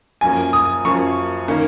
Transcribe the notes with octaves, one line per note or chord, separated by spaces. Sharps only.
F#2 F3 A#3 C#4 G#5
D#6
F#2 F3 A#3 C#4 C#6
D#3 A#3 C#4